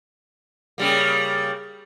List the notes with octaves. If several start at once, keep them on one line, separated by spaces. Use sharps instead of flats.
C#3 G3 A#3